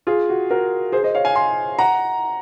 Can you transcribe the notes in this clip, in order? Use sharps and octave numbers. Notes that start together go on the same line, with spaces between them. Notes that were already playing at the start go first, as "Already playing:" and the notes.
F4 G#4
F#4
F#4 A#4
G#4 C5
C5 D#5
C#5 F5
F5 G#5
G#5 C6
F#5 A#5